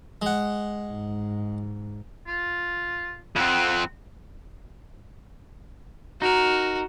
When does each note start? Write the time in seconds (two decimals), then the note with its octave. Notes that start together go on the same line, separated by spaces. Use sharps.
0.22 G#3 F#5
0.91 G#2
2.27 F4
3.36 F2 C4 F#5
6.22 D#4 F#4 A#4